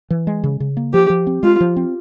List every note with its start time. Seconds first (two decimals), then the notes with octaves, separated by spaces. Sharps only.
0.10 E3
0.27 G#3
0.44 C#3
0.60 C#3
0.77 A#3
0.93 F3 G4
1.10 F3
1.27 C4
1.43 G#3 F4
1.60 F3
1.76 C4